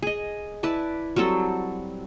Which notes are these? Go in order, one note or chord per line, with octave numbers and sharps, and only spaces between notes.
G#4 D#5
E4 B4 D5 A5
F#3 G3 C4 A4